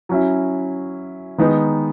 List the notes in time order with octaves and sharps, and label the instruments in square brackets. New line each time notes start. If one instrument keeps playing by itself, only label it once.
[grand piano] F#3 C#4 E4
D#3 G#3 B3 D#4